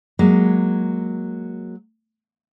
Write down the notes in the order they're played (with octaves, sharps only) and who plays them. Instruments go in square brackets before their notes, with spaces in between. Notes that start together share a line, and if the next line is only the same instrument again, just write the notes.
[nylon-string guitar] F#3 G#3 A#3